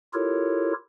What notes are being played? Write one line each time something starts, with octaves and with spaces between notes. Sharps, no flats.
E4 F4 G4 A4 A#4 C#5